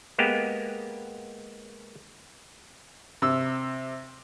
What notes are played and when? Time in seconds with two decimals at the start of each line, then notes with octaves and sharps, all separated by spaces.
0.18 G#3 A#3 B3 G4
3.22 C3 E6